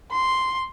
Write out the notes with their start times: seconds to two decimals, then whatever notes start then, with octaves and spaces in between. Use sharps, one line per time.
0.12 C6